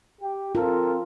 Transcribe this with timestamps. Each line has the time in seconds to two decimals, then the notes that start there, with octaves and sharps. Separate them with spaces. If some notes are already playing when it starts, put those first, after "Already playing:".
0.22 G4
0.55 C4 F4 A4 A#4